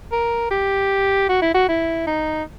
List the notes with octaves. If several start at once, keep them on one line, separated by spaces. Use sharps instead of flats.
A#4
G4
F#4
E4
F#4
E4
D#4